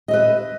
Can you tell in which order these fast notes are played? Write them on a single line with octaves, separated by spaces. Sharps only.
D#5 E5 B4